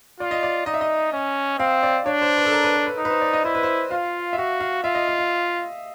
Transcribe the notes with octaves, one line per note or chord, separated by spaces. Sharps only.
F4 D5
D#5
D5
D#4 D#5
E5
D#5
C#4
C4 F5
D5
D4 C#5
C5
B4
A4
A#4
B4
B4
B4
D#4
B4
C5
D5
D#5
E4 C5
B4
C5
F4 F5
E5
F#4 F5
F5
F4 E5
D#5
F5
F5